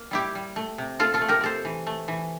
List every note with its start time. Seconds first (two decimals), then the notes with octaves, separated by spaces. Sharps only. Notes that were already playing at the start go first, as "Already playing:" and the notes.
Already playing: A#3
0.11 G3 E4 G4
0.35 G3
0.56 A3
0.78 C3
0.99 A3 F4 A4
1.14 F4 A4
1.21 A3
1.28 G4 A#4
1.41 C4 A4 C5
1.65 E3
1.87 A3
2.08 E3